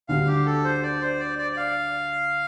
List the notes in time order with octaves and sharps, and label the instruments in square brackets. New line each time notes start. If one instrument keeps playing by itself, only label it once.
[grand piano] D2 D3 G3 [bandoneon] F5
[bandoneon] G4
A4
C5
D5
C5
D5
D5
D5
F5